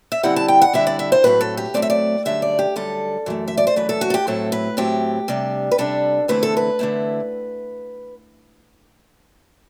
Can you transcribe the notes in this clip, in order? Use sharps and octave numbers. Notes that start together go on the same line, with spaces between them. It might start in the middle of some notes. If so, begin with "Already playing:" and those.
E5
D3 G3 C4 E4 F#5
A5
G5
F#5
D3 G3 C4 E4 E5
D5
E5
C5
A2 F#3 A3 C4 B4
A4
G4
A2 F#3 A3 C4 D5
E5
D5
F#2 D3 G3 E5
D5
G4
F#2 D3 G3 A4
F#2 E3 A3
E5
D5
C5
F#2 E3 A3 B4
A4
F#4
A4
G4
A2 F#3 C4 E4 A4
B4
A2 F#3 C4 E4 G4
C3 G3 D4
B4
C3 G3 D4 A4
E2 D3 A3 C4 E4 B4
A4
B4
E2 D3 A3 C4 E4